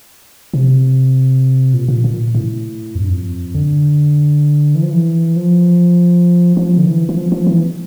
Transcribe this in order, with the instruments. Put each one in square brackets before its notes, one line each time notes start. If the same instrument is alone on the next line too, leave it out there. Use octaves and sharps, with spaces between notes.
[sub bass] C3
A#2
A#2
A#2
A2
F2
G2
F2
D3
E3
F3
E3
F3
F3
D3
E3
E3
F3
F3
E3